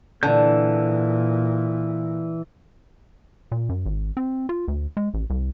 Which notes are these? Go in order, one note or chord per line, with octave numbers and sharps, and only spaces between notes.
A#2 D3 E3 A5 G6
A#2
F#2
G#1
C4
F4
D2
G#3
A1
C2